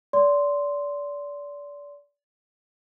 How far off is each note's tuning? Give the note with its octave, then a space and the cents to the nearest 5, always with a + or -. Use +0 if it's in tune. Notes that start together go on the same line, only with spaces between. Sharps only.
D5 -30 C6 -5